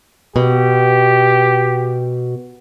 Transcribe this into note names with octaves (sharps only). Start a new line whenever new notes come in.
B2 G4